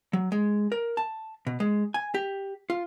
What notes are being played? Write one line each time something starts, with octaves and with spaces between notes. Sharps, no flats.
F#3
G#3
A#4
A5
B2
G#3
G#5
G4
F4